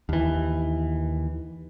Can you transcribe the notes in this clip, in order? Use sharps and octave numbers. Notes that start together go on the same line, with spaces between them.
D#2 E3